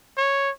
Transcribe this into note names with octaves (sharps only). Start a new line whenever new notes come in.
C#5